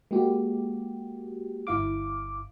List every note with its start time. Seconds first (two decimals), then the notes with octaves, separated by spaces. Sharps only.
0.11 G#3 A#3 F#4 G4
1.67 G1 E4 F5 D6